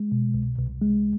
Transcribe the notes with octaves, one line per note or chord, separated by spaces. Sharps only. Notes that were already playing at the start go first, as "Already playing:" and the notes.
Already playing: G#3
B2
C2
C2
G#3